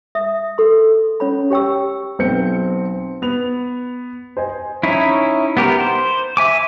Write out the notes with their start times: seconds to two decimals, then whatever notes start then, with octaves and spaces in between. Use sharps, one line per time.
0.15 E5 D#6
0.58 A4 C6
1.20 C#4 C#5 B5
1.50 G4 C#5 G5 C#6 E6
2.19 B1 B3 C4 G6 C#7
3.22 B3 F7
4.37 C5 D#5 G#5
4.83 C#4 D#4 E4
5.57 B3 G4 A#4
5.80 C5
6.37 E5 G#5 D6